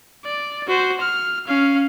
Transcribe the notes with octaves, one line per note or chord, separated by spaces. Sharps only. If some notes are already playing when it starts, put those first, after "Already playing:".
D5
F#4 C5
F6
C#4 F5